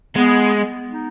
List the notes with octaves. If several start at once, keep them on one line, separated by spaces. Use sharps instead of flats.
G#3 B3
B3
D#4